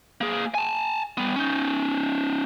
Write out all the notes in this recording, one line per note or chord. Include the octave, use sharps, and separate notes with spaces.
A#3 G#4
G#5 A5
G3 B3
C#4 D#4